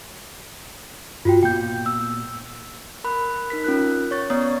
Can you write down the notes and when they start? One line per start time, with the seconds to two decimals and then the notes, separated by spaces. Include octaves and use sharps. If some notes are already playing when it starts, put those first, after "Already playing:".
1.25 G2 F4 F#4 G5
1.43 A#2 A#3 B3 G5 G6
1.86 E6
3.04 A#4 B5 F#6
3.50 D#4 A#4 B6
3.64 C#4 F4 A#4 F#6
4.11 C#5 C#6 A6
4.30 B3 C#4 C#5 D5 A#5 D#6